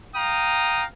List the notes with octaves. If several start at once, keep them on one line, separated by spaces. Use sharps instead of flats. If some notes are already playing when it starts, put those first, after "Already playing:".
F5 G5 A#5 D#6